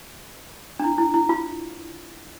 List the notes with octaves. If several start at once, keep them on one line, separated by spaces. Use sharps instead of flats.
D4
E4
E4
E4
F4